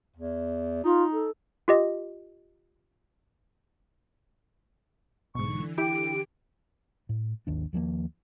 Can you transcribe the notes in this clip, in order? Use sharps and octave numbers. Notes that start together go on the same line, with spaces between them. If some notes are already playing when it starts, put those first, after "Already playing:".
E2
D#4 F4
A4
F4 G4 D#5
B1 G#2 D3 E3 C#6
E4 G4 D7
A2
G#1 D#2 D4
D#2 F3 G3 A#3